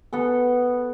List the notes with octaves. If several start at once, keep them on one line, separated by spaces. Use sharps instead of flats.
B3 A4